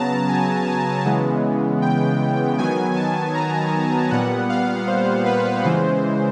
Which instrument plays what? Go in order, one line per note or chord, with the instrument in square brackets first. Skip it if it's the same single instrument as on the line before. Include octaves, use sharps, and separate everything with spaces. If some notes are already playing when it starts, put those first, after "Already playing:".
Already playing: [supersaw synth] C#3 F#3 B3 A5 A#5
G#5
G#5
C#3 E3 G#3 B3
G5
D#3 F#3 B3 G#5
A5
A#5
A#2 G3 B3 F#5
F5
C5
B4
C#3 E3 G#3 C5